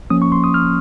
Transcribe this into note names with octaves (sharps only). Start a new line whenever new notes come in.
F3 A#3 C#4 D#6
C#6
C6
D#6
F6